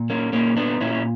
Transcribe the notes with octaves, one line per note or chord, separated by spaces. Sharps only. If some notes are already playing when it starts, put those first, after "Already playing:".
Already playing: A#2
A#3 C#4
A#2 A#3 C#4
B3 D4
A#2 C#4 E4